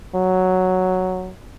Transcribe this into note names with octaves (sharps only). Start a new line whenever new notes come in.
F#3